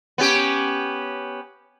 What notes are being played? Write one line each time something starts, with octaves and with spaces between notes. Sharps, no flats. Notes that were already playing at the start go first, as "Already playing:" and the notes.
B3 C#4 G4